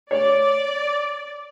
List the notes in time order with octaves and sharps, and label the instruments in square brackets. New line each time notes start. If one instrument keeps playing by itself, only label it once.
[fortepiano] C#5 [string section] D5